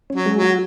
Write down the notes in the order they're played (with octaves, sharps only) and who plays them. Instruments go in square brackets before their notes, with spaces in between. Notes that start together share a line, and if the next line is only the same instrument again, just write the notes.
[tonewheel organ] C#4
[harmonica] F#3
[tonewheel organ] G#3
[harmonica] F#3
[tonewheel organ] F#4